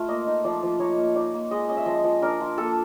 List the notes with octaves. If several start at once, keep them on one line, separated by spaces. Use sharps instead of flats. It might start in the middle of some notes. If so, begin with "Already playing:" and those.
Already playing: A3 F4
A#3 D#5
D#4
F3 D5
F3
D#4 C#5
A#3
D#4 D5
A#3
G#3 D#5
C#4 D#5
E5
F3 D#5
F3
D4 A#4
F4
A#3 A4